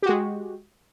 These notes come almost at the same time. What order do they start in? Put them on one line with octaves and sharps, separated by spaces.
G4 F#4 G#3